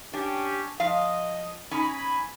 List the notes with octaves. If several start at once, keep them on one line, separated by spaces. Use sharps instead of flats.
C#4 D4 G4
F3 D#5 F5
C#4 D#4 G#5 B5